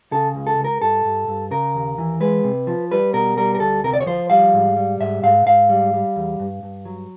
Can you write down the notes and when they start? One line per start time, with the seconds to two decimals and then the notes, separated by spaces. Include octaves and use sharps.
0.12 C#3 A4
0.35 C#2
0.47 A4
0.58 C#2
0.64 A#4
0.82 G2 A4
1.05 G2
1.28 G2
1.51 C#3 A#4
1.75 D#2
1.98 E3
2.20 G#3 B4
2.44 C3
2.67 F3
2.91 G3 B4
3.13 B2 A#4
3.37 G3 A#4
3.55 A#4
3.60 D2 A4
3.84 C3 A#4
3.93 D5
4.01 C#5
4.06 F3 C5
4.30 G3 F5
4.53 G#2
4.76 G3
5.00 G#2 E5
5.23 G#2 F5
5.46 G#2 F5
5.69 G3
5.94 G3
6.16 E2
6.40 G2
6.63 G2
6.85 F#3